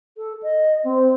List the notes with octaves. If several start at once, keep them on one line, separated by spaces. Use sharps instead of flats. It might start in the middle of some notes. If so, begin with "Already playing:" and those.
A4
D#5
C4